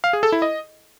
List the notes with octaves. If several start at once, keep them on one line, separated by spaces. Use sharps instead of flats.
F5
G#4
A4
E4
D#5